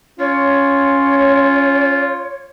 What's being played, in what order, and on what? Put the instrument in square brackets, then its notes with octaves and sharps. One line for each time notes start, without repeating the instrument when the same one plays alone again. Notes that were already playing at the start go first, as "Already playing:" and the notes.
[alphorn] C#4 [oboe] F4 [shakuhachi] C#5